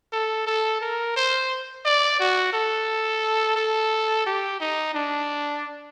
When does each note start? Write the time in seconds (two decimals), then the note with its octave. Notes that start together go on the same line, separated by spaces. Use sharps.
0.12 A4
0.46 A4
0.81 A#4
1.16 C5
1.85 D5
2.19 F#4
2.53 A4
3.56 A4
4.26 G4
4.60 D#4
4.94 D4